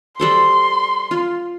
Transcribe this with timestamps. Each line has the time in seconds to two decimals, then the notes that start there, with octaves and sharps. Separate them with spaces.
0.20 G3 A4 C5 C6
1.11 F4